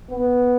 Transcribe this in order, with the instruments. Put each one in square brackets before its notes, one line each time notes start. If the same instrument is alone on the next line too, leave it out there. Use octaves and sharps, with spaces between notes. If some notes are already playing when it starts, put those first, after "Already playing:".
[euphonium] B3